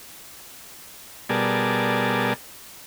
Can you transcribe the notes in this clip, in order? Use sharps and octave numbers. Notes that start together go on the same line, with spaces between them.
B2 G3 G#4 A#4 D5 A5